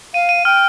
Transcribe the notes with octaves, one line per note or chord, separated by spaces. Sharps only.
F5 D#7
D#7
G5 F6